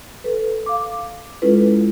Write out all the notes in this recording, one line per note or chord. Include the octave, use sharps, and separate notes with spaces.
A4 B4
F5 D6
G#3 C#4 E4 F4 A4 B4